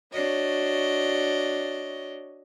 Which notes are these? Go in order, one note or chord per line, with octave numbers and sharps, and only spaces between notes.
D4 F#4 C#5 D#5